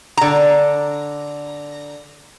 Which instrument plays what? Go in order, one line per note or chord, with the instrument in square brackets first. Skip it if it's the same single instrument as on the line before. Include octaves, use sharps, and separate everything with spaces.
[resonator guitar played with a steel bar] D3 A#5